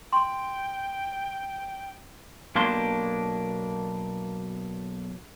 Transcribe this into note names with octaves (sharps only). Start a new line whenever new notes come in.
G5 C6
B1 B2 A#3 D4 G4 C6